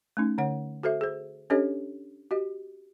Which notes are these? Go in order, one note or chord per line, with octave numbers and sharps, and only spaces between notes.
A3 C#4 D#4
D3 C#5 F#5
F#4 A4 C5 E5
G#4 C5
C#4 D4 G4 A4 C#5 D#5
F#4 G4 D#5